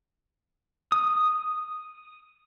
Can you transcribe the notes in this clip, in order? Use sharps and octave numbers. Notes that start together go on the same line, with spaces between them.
D#6